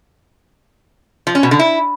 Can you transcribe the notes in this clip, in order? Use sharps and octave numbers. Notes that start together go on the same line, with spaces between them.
F3
C#4
B2
D3
E4